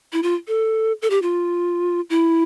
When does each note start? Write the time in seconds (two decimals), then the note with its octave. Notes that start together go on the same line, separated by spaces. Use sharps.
0.13 E4
0.23 F4
0.48 A4
1.02 A4
1.10 G4
1.22 F4
2.10 E4